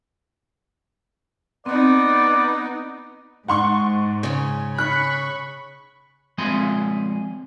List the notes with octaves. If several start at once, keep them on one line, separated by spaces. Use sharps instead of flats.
B3 C4 D#4 D5
G#2 F#5 C6 C#6
C#3 C#4
B5 C#6 F#6
F3 G#3 C4 G#5 B5 C6